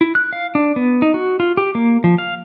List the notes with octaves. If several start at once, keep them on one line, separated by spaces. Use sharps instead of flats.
E4
F#6
F5
D4
B3
D#4
F#4
F4
G4
A#3
F3
F5